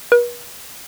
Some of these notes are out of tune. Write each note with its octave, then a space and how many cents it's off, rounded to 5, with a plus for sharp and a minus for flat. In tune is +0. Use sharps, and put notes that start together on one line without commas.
B4 -45